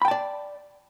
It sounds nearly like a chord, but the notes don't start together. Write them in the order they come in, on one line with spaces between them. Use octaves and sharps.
B5 G5 A5 D5